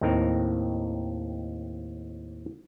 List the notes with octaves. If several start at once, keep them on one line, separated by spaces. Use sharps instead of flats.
D#2 A2 C4 D#4 A#4